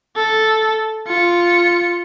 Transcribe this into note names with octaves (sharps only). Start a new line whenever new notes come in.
A4
F4 C#7